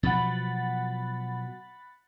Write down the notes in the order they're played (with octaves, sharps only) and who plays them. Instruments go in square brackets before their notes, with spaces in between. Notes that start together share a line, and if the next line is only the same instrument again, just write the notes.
[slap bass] B2 F3 F#3 [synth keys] F#5 B5 A6